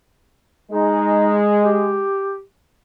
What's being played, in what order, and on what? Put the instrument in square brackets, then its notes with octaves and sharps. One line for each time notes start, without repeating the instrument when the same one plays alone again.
[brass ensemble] G#3 [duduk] D#4
[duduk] G4